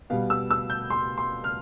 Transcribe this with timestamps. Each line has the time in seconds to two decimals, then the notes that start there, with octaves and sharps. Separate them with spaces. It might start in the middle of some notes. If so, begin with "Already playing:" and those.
0.10 B2 G3 B3 F5
0.30 E6
0.51 E6
0.70 G6
0.90 C6
1.18 C6
1.44 F6